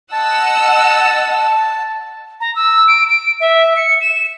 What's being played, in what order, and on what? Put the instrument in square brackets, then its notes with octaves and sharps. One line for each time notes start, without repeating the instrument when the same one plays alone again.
[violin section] D#5 F#5 E6 [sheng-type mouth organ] A5
[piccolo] A#5
E6
D7
D7
E5
C#7
E7